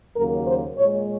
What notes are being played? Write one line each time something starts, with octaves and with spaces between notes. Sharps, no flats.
D#2 C#3 F#3 A#3 A#4
C5
A#2 G#3 C#5